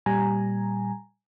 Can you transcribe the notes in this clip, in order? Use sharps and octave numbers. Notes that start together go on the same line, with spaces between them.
A#2 G3 G#5 A#5